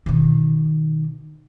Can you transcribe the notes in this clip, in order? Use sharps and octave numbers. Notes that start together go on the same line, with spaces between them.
B2 D#3